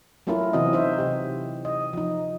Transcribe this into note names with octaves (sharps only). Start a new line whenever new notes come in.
F#3 A3 C#4 E4 F4 A#4
C3 E3 C4 F#4 D#5
D#4 C5 E5
C3 G4
D#5
F3 D#4